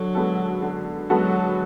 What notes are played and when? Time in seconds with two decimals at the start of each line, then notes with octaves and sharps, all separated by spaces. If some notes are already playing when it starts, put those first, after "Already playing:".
Already playing: D3 F#3
0.15 G#3 B3 F#4 A4
0.62 D3
1.10 F#3 G#3 B3 F#4 A4